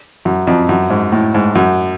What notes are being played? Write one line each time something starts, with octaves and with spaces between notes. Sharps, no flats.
F#2
F2
F#2
G#2
A2
G#2
F#2